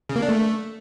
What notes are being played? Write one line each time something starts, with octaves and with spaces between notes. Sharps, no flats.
C#3
A#3
D4
A3